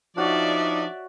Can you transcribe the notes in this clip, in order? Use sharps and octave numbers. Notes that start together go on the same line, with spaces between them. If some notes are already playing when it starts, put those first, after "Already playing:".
F3 D4 D#4 F#4 C#5 D5 E5